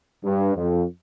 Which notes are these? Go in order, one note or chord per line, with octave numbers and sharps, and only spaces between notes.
G2
F2